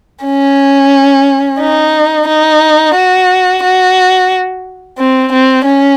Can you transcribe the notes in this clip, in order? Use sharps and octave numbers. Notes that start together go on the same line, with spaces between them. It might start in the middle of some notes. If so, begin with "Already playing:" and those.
C#4
D#4
D#4
F#4
F#4
C4
C4
C#4